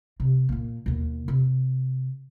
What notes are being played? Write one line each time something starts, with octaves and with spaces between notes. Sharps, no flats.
C3
A#2 A#3
D#2 B2
C3